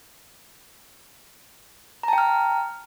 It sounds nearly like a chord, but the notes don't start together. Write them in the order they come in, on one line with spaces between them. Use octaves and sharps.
A#5 A5 G5 F6